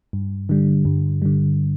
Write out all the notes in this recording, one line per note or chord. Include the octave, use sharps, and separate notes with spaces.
G2
D3 G3
G2
D3 G3